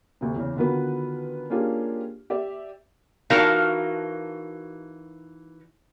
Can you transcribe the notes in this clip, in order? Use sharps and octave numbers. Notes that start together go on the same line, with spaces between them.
D2 C3
E2 C#3
D3 D#3 B3 F4 F#4 B4
A#3 C#4 D4 F4 G4 G#4
G4 D5 E5
E3 D#4 F#4 A#4 F5 A5